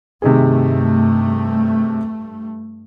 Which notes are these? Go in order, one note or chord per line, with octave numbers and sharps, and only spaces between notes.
G2 C3 D#3 A3 G#4